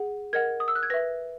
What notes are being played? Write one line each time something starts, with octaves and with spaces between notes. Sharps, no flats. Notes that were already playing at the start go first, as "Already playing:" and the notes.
Already playing: G#4 F#5
A#4 D#5 F#5 G#6
D#6
E6
F#6
G#6
B4 E5 A#6